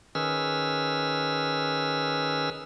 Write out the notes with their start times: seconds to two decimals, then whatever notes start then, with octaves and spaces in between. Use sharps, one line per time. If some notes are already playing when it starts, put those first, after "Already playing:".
0.15 D#3 C#4 G#4 B4 E6 F6